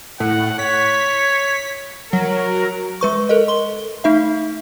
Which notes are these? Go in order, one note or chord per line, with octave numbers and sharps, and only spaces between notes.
A2 F#5
C#5 B6
F#3 A#4
G#3 B4 C#6
A4 A#4 D#5
C6 G7
A3 D#4 E5